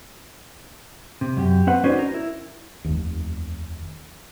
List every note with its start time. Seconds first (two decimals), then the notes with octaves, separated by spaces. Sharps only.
1.21 C3
1.37 F#2 G4
1.67 C4 B4 F#5
1.84 C#4 D#4 F#4 B4 C5 D5
1.99 A#4
2.14 E4
2.84 F1 D#2